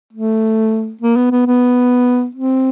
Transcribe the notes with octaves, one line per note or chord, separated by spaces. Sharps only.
A3
A#3
B3
B3
B3
C4